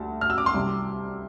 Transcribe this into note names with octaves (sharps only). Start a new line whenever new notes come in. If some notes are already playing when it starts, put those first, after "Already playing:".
Already playing: D2 G3 A5
F6
E6
D6
C6
C2 C3 G3